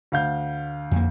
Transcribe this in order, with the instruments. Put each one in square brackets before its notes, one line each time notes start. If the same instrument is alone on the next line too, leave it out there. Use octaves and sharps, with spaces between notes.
[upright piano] D2 F5 G6
[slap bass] F2 A#3